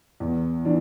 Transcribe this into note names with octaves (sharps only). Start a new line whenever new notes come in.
E2
E3 D4